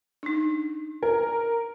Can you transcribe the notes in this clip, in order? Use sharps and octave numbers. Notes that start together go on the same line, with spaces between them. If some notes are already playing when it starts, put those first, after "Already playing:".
D4 D#4
A#4